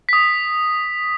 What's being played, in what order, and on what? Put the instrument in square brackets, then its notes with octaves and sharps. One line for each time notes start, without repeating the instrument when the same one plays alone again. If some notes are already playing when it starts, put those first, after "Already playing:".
[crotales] D#6 B6